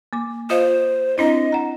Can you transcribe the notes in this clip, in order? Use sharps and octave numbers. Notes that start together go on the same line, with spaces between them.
A#3 D6
F4 C5 D#5 F5
C4 D4 E4 D#5
F#5 A#5